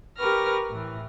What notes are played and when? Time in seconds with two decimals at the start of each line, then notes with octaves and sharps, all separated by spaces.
0.18 G4 A#4 B4 C#6 F6 A#6
0.69 A2 E3